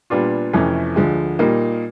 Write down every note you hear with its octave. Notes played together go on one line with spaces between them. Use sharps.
A#2 G3 B3 D4 F4
F2 C3 E3 A3 C#4
D2 D3 F3 G#3
A#2 G3 A#3 D#4